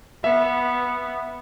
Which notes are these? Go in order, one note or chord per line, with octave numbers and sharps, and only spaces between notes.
B3 E5